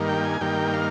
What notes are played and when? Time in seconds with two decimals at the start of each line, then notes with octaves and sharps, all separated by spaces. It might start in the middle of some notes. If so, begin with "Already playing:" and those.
Already playing: G2 D#3 A#3
0.09 G5
0.25 G#5
0.41 G2 D#3 A#3 G5
0.73 F5